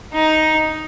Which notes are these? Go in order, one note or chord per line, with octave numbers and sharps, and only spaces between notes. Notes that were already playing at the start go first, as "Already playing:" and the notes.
D#4